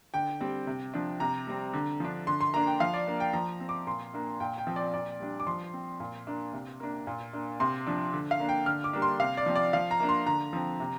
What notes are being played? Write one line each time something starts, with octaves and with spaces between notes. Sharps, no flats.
D3 G5
G3 C4
C3
F3 D4
C3 A#5
G3 C4
D3
F3 D4
D3 C6
C6
A#3 D4 A#5
G5
F3 F5
D5
A#3 D4
G5
F3 A#5
C4
D6
A#2 C6
A#3 D4
A#2 G5
G5
F3 C4
D5
A#2 D5
G3 D4
D6
F3 C6
C4
A#2
A#3 D4
C3
A#3 D4
A#2
A#3 D4
C3 C6
F3 D4
D3
F5
A#3 D4
G5
D3 F6
D6
G3 A#3 D4
C6
C3 F5
D5
F3 C4
D5
F3 F5
A#5
A#3 D4
C6
D3 A#5
F3 C4
C3